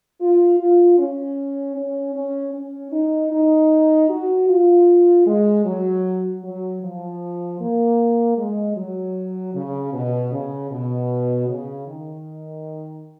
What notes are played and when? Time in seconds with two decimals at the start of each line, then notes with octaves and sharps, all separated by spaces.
0.21 F4
0.59 F4
0.99 C#4
1.76 C#4
2.15 C#4
2.54 C#4
2.93 D#4
3.32 D#4
4.09 F#4
4.49 F4
5.27 G#3
5.65 F#3
6.43 F#3
6.82 F3
7.60 A#3
8.38 G#3
8.76 F#3
9.55 C#3
9.94 B2
10.32 C#3
10.71 B2
11.48 C#3
11.87 D#3